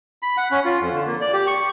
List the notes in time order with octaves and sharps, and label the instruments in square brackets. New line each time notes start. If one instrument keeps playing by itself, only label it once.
[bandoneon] B5
F#5
C#4
F4
F2
D3
A#3
D5
G4
C#6